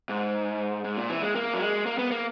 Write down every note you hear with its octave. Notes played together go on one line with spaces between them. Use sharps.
G#2
G#2
A#2
E3
G#3
A#3
F#3
G#3
A#3
B3
A#3